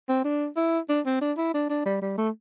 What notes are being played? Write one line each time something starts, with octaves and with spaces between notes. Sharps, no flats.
C4
D4
E4
D4
C4
D4
E4
D4
D4
G3
G3
A3